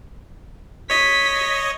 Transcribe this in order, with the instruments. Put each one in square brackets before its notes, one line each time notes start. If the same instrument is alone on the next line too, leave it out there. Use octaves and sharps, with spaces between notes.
[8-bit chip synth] C#5 D#5 [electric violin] B6